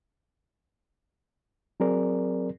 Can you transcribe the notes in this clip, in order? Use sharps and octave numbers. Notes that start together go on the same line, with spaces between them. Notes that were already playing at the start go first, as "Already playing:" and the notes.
F#3 C4 G#4 A#4 D5